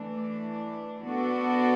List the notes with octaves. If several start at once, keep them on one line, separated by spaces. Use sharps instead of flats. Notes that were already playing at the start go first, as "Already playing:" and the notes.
Already playing: E3 A3 D4
B3 D4 F#4 A4 D5